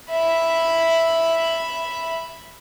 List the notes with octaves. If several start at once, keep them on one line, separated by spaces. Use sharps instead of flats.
E5 B5